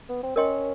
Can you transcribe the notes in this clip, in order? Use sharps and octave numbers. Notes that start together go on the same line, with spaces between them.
B3
C4
C#4 A#4 D#5 G5 C6